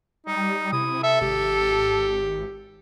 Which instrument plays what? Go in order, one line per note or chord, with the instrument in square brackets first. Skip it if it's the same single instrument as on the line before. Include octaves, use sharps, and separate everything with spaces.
[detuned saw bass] G3 [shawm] D#4
[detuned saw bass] C3 [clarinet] E4 [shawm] D#6
[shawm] A4 [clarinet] E5
[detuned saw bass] G#1 [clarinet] G4